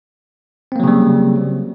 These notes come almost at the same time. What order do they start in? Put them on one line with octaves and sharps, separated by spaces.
C4 A#3 F#3 C#3 G3